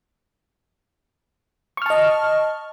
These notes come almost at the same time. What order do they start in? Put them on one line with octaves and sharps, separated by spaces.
C#6 F6 A5 D#5